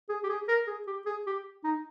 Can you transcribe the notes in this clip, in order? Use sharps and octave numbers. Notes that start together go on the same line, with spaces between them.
G#4
G4
G#4
A#4
G#4
G4
G#4
G4
D#4